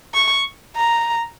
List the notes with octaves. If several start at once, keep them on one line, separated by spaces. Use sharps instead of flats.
C#6
A#5